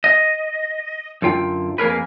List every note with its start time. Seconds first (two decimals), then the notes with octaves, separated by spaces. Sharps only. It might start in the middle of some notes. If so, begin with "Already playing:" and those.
0.04 D#5
1.22 F#2 D3 F4 G5
1.78 F2 A#3 G#4 A#4 B4